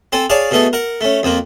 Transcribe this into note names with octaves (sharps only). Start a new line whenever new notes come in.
C4 A4 G#5
G#4 C#5 D5 F5 A5
B2 A3 G#4 A4
A#4 F#5
A3 C#4
F2 F3 A#3